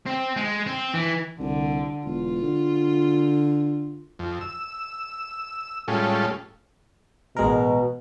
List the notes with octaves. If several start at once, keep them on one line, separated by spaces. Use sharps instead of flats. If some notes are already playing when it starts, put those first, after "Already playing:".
C4
G#3
C4
E3
C2 D3
E1 F4
D3
F2
E6
A2 G3 G#3 C#4 F4 A4
A1 B2 G#3 A#4